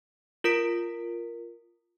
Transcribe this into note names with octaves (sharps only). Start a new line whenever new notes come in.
F4 A#4 B6 D7